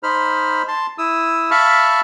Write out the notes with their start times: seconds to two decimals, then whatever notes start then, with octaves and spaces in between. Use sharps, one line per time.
0.03 D#4 C5 B5 F6
0.68 A5 C6
0.98 E4 D#6 E6
1.51 E5 F5 A5 B5 C#6 F6